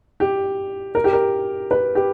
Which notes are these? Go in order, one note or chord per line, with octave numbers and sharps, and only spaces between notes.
G4
A#4
G4
A#4
B4
G4